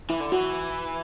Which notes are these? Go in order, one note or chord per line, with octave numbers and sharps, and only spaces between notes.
E3 E4
D3
E3 F#4